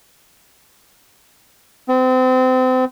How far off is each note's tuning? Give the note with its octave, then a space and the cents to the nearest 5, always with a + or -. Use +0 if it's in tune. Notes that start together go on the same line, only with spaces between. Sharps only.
C4 -30